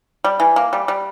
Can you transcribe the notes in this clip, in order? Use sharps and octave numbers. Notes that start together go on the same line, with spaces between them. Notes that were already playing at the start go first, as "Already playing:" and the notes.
G3
E3
A#3
G3
G3